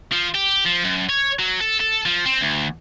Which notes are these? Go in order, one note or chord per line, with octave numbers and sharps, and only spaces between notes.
F3
G4
F3
F#2
C#5
F#3
A4
A4
F3
C4
D2